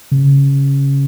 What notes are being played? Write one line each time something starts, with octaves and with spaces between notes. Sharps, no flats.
C#3